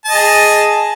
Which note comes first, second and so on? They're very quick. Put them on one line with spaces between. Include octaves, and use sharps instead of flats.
A5 D#5 G#4